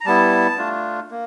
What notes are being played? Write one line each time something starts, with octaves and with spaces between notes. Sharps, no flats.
A#5
G3 B3 E4 A5
A3 D4 F4
A#3